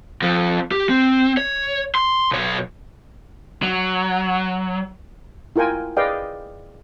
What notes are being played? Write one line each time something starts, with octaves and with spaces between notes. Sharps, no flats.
F2 F3
G4
C4
C#5
C6
B1 C#5
F#3
E4 F4 A#4 G5 G#5
G#4 B4 D5 D#5 F5 G5